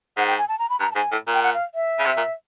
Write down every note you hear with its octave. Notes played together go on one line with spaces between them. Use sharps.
G#2 F#5
G5
G#5
A5
A#5
B5
G2 A#5
A5
G#2 G#5
A2
A#2
G5
F#5
F5
E5
C#3
C3
A#2